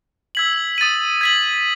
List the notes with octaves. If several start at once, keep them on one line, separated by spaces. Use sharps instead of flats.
E6 G#6 B6 F#7
D#6 A6 D#7
G#6 B6 F#7